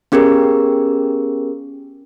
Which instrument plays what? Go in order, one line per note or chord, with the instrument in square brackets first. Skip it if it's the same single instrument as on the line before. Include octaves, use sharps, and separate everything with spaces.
[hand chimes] B3 C#4 G4 G#4 A#4